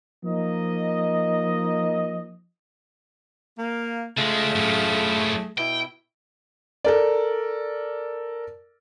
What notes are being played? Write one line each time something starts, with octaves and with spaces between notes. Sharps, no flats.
F3 A#3 D#4 D#5
A#3
C#2 G#3 A3 F4 G#4
F#2 A2
B2 E4 G5
A4 A#4 D5